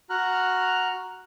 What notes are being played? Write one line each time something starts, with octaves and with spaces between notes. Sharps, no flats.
F#4 A#5 F6 F#6